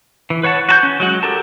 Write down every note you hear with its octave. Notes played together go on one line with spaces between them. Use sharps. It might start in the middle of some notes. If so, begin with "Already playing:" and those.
E3
B4 C#5 F#5 A5
F#4 A5 G6
C#4
F#3 G#3 F#4
G4 A4 A#4 A5